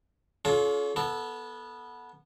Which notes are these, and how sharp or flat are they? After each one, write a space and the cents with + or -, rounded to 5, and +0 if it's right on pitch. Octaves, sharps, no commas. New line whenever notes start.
C#4 +35 F4 +25 A4 -40
B3 -15 A4 +0